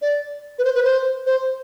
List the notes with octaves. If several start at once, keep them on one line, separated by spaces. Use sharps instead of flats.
D5
B4
C5
B4
C5
C5